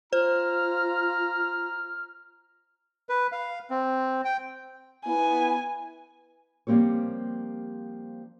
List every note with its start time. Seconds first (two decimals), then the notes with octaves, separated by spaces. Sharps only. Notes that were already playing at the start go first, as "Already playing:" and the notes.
0.13 F4 C5 A#5 F6
3.09 B4
3.32 F5
3.70 C4
4.25 G5
5.06 B3 E4 G#5
6.67 F3 G3 A#3 C4 G4 C#5